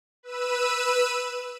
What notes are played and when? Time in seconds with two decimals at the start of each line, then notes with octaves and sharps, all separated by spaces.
0.23 B4 E6 D#7